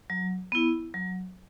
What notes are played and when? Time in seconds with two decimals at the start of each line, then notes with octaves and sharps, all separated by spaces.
0.10 F#3
0.52 B3 E4
0.94 F#3